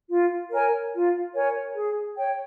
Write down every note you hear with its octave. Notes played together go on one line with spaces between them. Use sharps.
F4
A#4 C#5 G#5
F4
A#4 C#5 G#5
G#4
C#5 G5